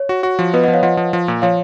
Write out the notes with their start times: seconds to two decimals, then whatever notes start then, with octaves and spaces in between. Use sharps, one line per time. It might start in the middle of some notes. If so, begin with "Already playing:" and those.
Already playing: C#5
0.09 F#4
0.23 F#4
0.39 F3
0.53 B3 B4 D#5
0.64 D#5 F#5
0.68 F3
0.73 C#5 F5
0.83 F3 D#5 F#5
0.97 F3
1.13 F3
1.28 A#2
1.42 F3 C#5 F5